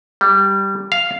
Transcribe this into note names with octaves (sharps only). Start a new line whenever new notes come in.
G3
F5